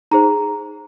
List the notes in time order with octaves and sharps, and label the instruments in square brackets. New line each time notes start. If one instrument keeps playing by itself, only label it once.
[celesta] D#4 G#4 C5 A#5